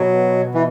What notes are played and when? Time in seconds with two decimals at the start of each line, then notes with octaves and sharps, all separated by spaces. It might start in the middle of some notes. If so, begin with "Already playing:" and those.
Already playing: B2 F#3
0.54 E3